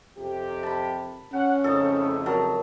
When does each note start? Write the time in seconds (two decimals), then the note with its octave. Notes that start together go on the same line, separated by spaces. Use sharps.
0.18 F2 C3 G4
0.63 A5 B5
1.34 C#4 F#5
1.64 F2 A2 C#3 D#4 A4
2.26 F#3 A#4 A5